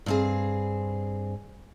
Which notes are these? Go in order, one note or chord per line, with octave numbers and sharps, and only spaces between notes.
G2 C4 G#4